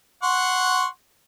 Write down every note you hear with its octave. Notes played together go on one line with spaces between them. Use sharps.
F#5 C6 C#6